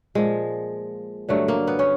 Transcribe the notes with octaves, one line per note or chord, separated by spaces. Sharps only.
A#2 F3 G#3
G2 D3 F#3 A3
A#3
B3
C#4